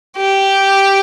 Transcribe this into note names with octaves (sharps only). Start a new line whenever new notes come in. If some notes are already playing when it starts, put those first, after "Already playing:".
G4